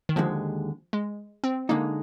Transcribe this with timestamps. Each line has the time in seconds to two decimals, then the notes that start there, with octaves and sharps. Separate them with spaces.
0.09 D#3
0.16 D#2 D3 F3 G#3
0.93 G#3
1.44 C4
1.69 D3 G#3 A#3 D#4